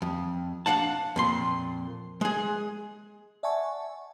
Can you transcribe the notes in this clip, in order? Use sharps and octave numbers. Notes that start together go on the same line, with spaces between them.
F2
D4 F5 F#5 A5
F2 A#2 C6
G#3 G#4
D5 E5 F#5 G#5 A5 C#6